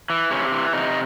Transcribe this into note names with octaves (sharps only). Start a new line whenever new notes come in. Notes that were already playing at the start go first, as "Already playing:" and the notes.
E3
C3 C#4
E3
C3 D#4